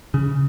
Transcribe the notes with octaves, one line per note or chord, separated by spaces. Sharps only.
C#3